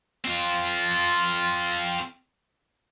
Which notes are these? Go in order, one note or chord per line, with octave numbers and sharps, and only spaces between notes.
C4 F4